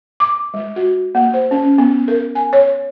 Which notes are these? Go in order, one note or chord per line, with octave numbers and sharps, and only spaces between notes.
D6
G#3
F#4
A#3
C5
C#4
B3
A#4
G#5
C#5